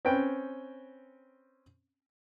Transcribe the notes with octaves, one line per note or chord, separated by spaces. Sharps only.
C4 C#4 B4 G5